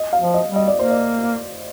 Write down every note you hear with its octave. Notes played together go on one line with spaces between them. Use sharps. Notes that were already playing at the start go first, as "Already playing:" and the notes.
Already playing: D#5
F5
F3
D#5
G3
D#5
D5
A#3 C5
D5